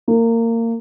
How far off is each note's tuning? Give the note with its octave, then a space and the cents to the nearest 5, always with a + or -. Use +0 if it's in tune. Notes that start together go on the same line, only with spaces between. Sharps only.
A#3 -25